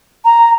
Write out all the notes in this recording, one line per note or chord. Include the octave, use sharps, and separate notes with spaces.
A#5